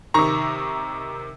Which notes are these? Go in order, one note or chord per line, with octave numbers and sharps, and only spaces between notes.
C3 D#3 A#5 C#6